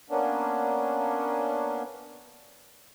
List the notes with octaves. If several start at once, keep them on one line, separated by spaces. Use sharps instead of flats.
A#3 B3 C#4 D4